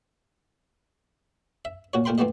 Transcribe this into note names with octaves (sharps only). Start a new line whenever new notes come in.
E5
A#2 F#4 C#5
A#2 A3 A#4 G5 B5 C6
G2 F3 A3 B3 G4 D#5